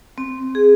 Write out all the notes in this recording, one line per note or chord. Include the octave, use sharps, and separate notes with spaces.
C4
G#4